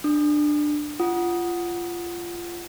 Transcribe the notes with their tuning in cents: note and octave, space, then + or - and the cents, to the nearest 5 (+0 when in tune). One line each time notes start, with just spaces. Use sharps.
D4 +15 D#6 -45
F4 -15 F#5 +0 D#6 +0